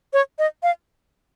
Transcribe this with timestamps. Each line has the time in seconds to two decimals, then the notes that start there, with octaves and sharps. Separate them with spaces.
0.13 C#5
0.39 D#5
0.63 F5